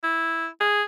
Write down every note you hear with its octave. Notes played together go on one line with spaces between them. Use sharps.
E4
G#4